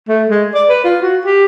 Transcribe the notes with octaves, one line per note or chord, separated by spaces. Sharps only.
A3
G#3
D5
B4
F4
F#4
G4